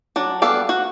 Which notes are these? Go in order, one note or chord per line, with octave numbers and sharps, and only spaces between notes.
F#3 D4
G3 B3 A4 D5 F5
F#4